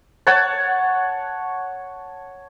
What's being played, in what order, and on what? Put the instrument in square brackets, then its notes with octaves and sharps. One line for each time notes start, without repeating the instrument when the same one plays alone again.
[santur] C#5 F#5 A5